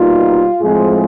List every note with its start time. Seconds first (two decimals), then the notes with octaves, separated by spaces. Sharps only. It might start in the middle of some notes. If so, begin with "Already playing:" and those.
Already playing: B2 G3 A#3 D#4 F4
0.61 A2 F3 G#3 C4 G#4